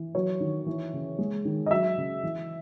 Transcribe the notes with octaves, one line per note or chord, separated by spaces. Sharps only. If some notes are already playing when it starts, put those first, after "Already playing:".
Already playing: E3
F#3 C#5
D#3
E3
C#3
G#3
D#3
D#5
F#3 E5
C#3
E3